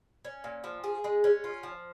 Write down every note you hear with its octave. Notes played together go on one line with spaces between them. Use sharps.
C#4
A#2
F3
G#4
G#3
C#4
F4
F3